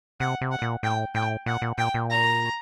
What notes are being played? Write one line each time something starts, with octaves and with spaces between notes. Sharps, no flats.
C3 F#5
C3
F#5
A#2
A2 G5
A2 G5
A#2 F#5
A#2
A#2 G5
A#2
A#5